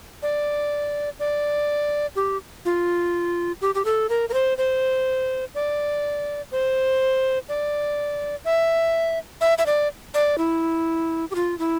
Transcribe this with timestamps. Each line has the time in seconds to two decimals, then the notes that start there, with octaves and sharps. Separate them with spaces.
0.23 D5
1.20 D5
2.16 G4
2.65 F4
3.61 G4
3.75 G4
3.85 A4
4.09 A#4
4.29 A#4
4.34 C5
4.58 C5
5.55 D5
6.52 C5
7.49 D5
8.45 E5
9.41 E5
9.58 E5
9.66 D5
10.14 D5
10.38 E4
11.31 G4
11.35 F4
11.59 E4